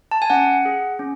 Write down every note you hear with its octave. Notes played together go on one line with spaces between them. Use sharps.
A5
G#5
C#4 F#5
G#4
C#4